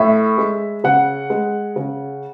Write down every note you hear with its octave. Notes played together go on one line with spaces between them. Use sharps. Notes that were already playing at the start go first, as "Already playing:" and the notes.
Already playing: A2 E5
G#3
C#3 F#5
G#3
C#3